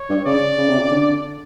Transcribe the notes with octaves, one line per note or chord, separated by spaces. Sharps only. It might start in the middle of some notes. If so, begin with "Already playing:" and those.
Already playing: C#5
G2
C#3 D5
C#3
C3
C#3
D3